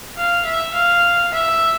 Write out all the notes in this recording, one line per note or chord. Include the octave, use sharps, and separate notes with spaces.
F5
E5
F5
E5